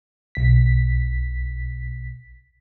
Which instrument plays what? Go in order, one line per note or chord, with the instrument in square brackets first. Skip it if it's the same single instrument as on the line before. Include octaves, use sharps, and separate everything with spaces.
[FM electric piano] B1 B6